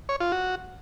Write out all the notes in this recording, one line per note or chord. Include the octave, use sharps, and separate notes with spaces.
C#5
F4
F#4